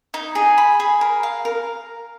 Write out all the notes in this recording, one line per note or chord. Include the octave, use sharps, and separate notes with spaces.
D#4
G#4
B5
G#4
A#4
F5
A#4